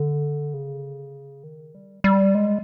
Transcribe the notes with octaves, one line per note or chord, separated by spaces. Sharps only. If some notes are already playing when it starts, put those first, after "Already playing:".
Already playing: D3
C#3
D#3
G3
G3
G#3